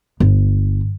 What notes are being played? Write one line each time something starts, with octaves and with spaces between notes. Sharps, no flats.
G1